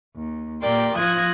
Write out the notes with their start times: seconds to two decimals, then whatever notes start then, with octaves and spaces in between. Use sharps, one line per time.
0.16 D#2
0.62 A#2 G4 A#4 D5 G5 C6
0.95 F3 F4 D#6 F#6 G#6 A#6